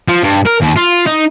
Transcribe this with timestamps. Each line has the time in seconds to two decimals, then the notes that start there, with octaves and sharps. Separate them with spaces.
0.09 F3
0.23 G2
0.46 A#4
0.61 D#2
0.76 F4
1.06 D#4